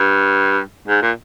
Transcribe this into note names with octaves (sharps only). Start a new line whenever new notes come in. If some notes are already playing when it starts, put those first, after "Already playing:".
Already playing: G2
G#2
A#2